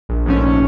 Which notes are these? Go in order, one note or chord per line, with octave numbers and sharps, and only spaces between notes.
A#1
G#2 F3 A3 C#4
A#1